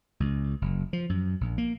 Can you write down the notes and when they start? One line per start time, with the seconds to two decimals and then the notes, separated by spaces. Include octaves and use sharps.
0.20 C#2
0.62 F#1
0.93 F3
1.09 F#2
1.41 A#1
1.58 A#3